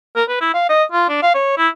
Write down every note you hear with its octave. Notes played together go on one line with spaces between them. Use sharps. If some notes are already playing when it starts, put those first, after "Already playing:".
A#4
B4
E4
F5
D#5
F4
D4
F5
C#5
E4